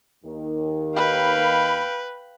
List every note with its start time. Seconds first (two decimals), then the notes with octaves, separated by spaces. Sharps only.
0.25 D#2 D#3
0.96 B4 F5 G5 B5